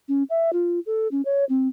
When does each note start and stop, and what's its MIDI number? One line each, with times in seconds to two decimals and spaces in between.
0.08 0.23 61
0.30 0.53 76
0.53 0.80 65
0.86 1.08 69
1.11 1.22 61
1.25 1.45 73
1.49 1.68 60